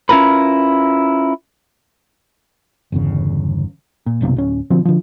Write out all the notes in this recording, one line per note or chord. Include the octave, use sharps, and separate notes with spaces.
C#4 E4 F4 A#4 B4
G1 E2 C#3
A#2
F#1 B1 C3 A#3
D1 C#4
B2 D3 F3 C4
D3 F3